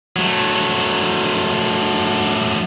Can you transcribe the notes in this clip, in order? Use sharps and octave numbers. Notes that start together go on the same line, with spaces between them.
F#3 A3